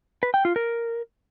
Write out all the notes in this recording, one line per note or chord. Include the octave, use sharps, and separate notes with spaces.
B4
G5
F4
A#4